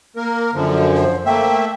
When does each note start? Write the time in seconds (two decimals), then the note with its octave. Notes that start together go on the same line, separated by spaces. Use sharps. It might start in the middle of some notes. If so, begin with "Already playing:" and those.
0.16 A#3 A#4
0.54 F#2 D3 F3
0.96 C5
1.26 A3 A#3 E5 G5